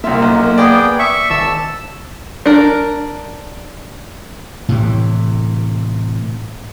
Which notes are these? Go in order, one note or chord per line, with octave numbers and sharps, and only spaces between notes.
C2 A#3 F4 E5
B1
B3 G#4 D5 G5
E5 C#6
G#1 A5 E6
D4 A#4
A2 C3 E3